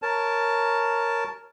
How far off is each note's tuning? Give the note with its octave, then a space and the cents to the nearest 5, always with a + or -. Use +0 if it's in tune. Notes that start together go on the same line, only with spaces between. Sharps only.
A#4 +0 C#5 +0 A5 +0